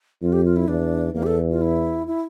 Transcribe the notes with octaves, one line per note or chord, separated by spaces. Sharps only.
F2 F4
G4
F4
E4
E2 D4
E2 A#3
G4
A4
F4
E4
E4